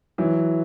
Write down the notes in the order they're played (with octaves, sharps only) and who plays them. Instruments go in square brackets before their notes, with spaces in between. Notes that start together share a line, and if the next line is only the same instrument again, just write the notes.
[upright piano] E3 F#3